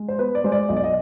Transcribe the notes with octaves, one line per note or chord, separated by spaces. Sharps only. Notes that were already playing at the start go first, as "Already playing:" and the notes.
Already playing: G#3
C5
B3 B4
D5
G#3 C5
D5
B1 D#5
D5
D#5